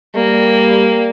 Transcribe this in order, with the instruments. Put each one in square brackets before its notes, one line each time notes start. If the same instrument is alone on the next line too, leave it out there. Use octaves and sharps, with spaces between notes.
[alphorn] G3 [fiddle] A#3